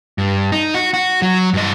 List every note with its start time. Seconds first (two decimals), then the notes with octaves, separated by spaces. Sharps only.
0.18 G2
0.52 D#4
0.74 F#4
0.94 F#4
1.22 F#3
1.53 G2 D#5